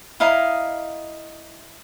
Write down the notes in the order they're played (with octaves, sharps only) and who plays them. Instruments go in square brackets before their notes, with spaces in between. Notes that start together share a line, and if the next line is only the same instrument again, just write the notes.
[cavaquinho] E4 D#5 F5 A#5